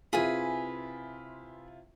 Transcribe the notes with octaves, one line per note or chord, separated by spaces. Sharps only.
C3 E4 F4 G#4 B4 G#5